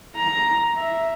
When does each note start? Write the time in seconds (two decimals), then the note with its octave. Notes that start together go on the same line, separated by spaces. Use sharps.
0.15 A#5
0.77 E5